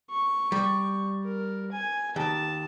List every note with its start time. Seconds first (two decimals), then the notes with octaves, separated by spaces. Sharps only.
0.10 C#6
0.52 G3
1.25 A#4
1.72 G#5
2.16 D#2 A5